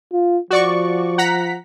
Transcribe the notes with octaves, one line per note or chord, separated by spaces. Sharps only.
F4
F3 F#4 D5 C#6
F#5 A#5 B6